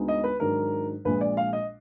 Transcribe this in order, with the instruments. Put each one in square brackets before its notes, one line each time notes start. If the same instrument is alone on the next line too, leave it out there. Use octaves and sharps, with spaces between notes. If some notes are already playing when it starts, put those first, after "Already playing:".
Already playing: [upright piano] D2 D3 G#3 B3 D#4
D#5
B4
G#2 D#3 F#3 D4 A#4
A#1 A#2 G#3 B4
D5
F5
D#5